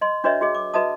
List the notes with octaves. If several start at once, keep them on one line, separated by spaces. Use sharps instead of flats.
D#5 C6
D4 F#4 B4 C#5 D#5 E5
F#4 G#4 D#5
D6
F#4 B4 D#5 E5 A5 D#6